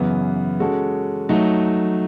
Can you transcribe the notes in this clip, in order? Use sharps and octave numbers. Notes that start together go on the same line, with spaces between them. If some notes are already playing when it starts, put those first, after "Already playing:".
Already playing: F#2 C#3 E3 B3
G#3 C#4 F#4 A4
F#3 A3 D#4